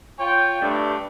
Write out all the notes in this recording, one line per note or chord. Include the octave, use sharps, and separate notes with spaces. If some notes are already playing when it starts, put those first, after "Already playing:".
F4 C#5 G5
G2 A3 D4